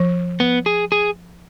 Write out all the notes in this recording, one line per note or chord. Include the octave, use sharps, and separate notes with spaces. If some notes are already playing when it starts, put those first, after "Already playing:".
Already playing: F3
B3
G#4
G#4